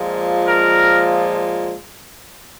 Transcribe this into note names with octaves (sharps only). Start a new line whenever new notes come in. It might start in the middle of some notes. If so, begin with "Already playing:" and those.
Already playing: A#2 F3 G#3
A#4